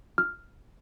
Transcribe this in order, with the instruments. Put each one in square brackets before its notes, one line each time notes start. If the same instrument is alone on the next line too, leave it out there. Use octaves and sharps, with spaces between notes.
[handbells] F6